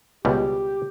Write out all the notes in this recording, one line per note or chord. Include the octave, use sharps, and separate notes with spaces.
C#2 B2 G3 G4